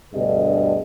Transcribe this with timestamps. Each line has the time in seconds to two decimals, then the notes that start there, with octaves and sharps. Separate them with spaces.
0.14 D2 G2 B2 D3 G#4 D#5